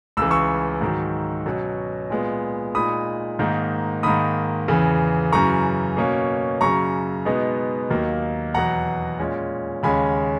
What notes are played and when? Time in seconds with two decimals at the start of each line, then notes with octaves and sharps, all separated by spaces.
0.17 C#2 C#3 E3 E6
0.31 C#6 E6
0.81 G#2 D#3 F#3
1.46 B2 F#3 C#4
2.10 A#2 G#3 B3
2.75 A#2 G#3 D#4 B5 D#6
3.39 G#2 D#3 A#3 D#4
4.03 G#2 D#3 A#3 B5 D#6
4.68 E2 C#3 E3
5.32 F#2 C#3 E3 A#5 C#6
5.97 B2 A#3 C#4
6.61 F#2 C#3 F#3 A#5 C#6
7.25 B2 G#3 B3 D#4
7.90 D#2 D#3 F#3 A#3 D#4
8.54 E2 B2 F#3 F#5 A#5
9.19 A#2 G#3 C#4
9.83 D#2 C#3 G#3 C#4 G#5 B5